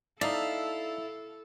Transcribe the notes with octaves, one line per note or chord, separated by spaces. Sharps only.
D#4 E4 A4 D5 F5 A5